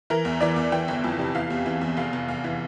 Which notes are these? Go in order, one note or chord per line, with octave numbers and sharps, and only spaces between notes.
E3 A#4
E2
E3 D5
E2
E3 G5
G1
F2
C3
E3 F5
E2
E3
E2
F1 F5
F1
E2 F5
E3